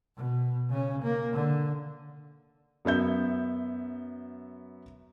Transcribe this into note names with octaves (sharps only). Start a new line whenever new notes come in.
B2
C#3 C#4
A#3
D3
F#2 B3 E5 G6